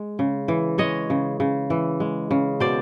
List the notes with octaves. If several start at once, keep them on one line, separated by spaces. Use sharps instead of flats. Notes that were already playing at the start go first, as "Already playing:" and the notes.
Already playing: G#3
C#3
E3
G#3 C#5 D#5
C#3
C#3
E3
G#3
C#3
B2 C5 D5